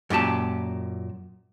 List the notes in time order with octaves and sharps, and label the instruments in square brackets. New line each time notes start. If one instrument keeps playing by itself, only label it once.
[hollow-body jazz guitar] F#2 A#2 G4 A5